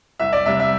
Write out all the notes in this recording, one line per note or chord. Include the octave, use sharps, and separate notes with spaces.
C2 E5
D5
C3 G3 E5
E5